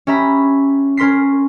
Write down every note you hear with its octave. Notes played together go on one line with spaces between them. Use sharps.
C#4 G4 E5 A#5 B5
C#4 A#4 C6 B6 C7